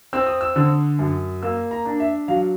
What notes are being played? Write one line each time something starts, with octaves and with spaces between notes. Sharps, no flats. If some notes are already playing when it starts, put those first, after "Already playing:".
C4 E6
D#6
E6
D3 E6
F#2
A#3 E6
A#5
D4
E5
F#3 F5